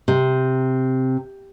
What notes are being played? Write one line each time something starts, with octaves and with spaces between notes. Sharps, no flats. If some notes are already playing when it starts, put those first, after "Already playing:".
C3